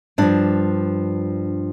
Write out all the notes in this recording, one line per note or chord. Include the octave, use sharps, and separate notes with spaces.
G2 F3 D4